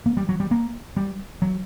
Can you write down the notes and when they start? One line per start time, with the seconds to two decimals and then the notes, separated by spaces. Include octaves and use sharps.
0.06 A#3
0.17 G3
0.29 F#3
0.40 G3
0.51 A#3
0.97 G3
1.42 F#3